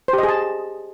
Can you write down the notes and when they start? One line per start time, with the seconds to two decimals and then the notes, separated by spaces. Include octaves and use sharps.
0.08 C5
0.13 G4
0.18 D#5
0.23 G#4
0.28 A5